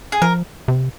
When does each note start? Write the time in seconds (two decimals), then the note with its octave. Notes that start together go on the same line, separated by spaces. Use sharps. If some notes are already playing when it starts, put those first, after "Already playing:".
0.12 G#4
0.22 F3 A#4
0.68 C3